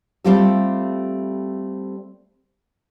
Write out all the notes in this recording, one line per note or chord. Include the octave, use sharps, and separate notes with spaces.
G3 A3 C4 F4 G4 A4